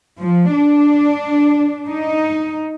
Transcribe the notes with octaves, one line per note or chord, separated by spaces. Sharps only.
F3
D4
D#4